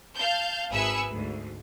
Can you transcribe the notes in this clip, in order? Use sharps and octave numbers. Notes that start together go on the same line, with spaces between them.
F5 A5 G6
G#1 G#4 B4 E5 E6 C#7
D2 G#2